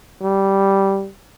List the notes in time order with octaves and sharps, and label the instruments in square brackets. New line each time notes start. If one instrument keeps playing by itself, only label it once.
[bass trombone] G3